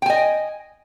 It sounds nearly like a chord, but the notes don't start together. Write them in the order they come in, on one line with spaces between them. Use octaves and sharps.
G5 G#5 D#5